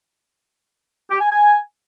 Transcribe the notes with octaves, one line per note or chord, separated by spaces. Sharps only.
G4
G#5
G#5